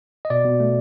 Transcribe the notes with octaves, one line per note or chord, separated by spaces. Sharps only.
D#5
B2 D5
B2
A3